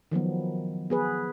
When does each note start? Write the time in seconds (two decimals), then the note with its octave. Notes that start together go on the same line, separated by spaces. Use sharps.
0.12 D#3 F3 F#3 B3
0.90 B3 G#4 B4